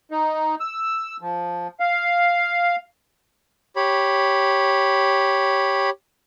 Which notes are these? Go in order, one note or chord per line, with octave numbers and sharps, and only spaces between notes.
D#4
E6
F3
F5
G4 C#5 B5